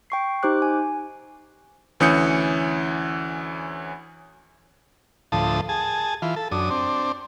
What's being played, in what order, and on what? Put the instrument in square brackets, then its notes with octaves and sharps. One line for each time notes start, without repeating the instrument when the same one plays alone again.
[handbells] G5 C#6 C7
D#4 G4 C5 D6 F#6
G#5
[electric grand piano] D2 E3 C#4 D#6 G6 C#7
[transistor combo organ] D2 A2 F3 A5 D#6
G#4 A5
E3 F4
A4
F#2 D4 D#6
C4 D4